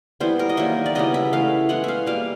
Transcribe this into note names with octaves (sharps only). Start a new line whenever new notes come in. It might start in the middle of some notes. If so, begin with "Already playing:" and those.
E3 G3 B3 C5
A#4
D#5
D#3 F#3 A#3 E5
D5
C#3 E3 G3 B3 D#5
E5
E3 A3 F5
E3 G#3 B3 F#5
E5 F5
B2 G3 A#3 F5